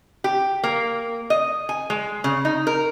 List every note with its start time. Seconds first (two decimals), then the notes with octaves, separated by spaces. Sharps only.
0.24 G4
0.64 A#3
1.30 D#5
1.69 G#5
1.90 G#3
2.24 C#3
2.45 D#4
2.67 A#4